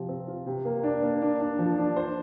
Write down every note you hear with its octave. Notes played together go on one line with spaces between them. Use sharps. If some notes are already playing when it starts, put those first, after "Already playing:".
Already playing: C3 F3 F4
C4
F4
C3
A#3
D4
A#3
D4
D4
F3
D4
C5